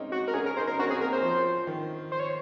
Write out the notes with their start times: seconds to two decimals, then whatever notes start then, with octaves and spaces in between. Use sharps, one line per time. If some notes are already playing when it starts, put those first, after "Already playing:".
Already playing: G#3 A#3 C4 C#4 D#4
0.12 F#4
0.28 A#4
0.34 C#4 G#4
0.46 A#4
0.56 D#4 C5
0.67 C#4 A#4
0.79 C#4 F#4
0.90 C4 G#4
1.00 A#3 A#4
1.13 C5
1.23 F3
1.67 D#3
2.12 C5
2.20 C#5